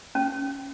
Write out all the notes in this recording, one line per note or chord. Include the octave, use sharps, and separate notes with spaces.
C#4